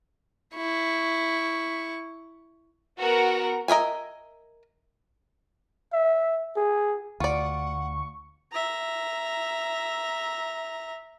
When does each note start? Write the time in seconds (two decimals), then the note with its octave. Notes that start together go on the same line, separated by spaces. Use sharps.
0.54 E4 C#6
2.98 B3 F#4 A#4 F#5 A#5
3.68 A#4 D#5 E5 G#5
5.93 E5
6.56 G#4
7.20 D2 F4 D5 F#5 C#6
8.52 E5 A#5